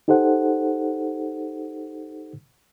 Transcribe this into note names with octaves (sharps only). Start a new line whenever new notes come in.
D#4 G4 A4 C5 F#5